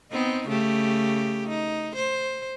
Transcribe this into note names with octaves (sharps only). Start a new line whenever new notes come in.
B3 C4 D#4
C#3 A3 G4
D#4
C5